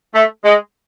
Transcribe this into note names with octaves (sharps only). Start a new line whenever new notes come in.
A3
G#3